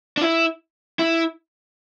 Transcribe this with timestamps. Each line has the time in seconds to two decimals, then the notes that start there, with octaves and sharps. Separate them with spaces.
0.17 D4
0.22 E4
0.99 E4